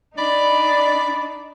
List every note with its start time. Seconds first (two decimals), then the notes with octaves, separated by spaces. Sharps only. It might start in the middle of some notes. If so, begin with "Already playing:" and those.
0.18 D4 D#4 D5 B5